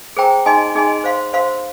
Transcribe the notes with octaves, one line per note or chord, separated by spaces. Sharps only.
G#4 C5 G5 A#5
D#4 G#4 D#5 G#5 C6
D#4 G#4 D#5 G#5 C6
C5 F5 C6
C5 F5 C6